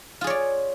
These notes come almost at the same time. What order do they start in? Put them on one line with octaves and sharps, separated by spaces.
F4 G#4 C#5 D5